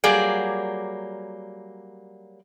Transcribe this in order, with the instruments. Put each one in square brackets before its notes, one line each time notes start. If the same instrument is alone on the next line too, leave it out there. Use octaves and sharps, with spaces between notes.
[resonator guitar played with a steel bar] F#3 G3 A#3 G#4 D5